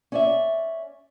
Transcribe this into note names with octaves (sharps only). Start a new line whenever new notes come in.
C#4 D5 E5